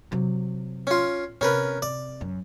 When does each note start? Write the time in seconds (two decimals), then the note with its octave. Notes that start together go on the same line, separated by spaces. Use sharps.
0.12 C3 F#3
0.87 C#4 F4
1.41 C3 C#4 A#4 B4
1.82 C3 D5
2.21 F#2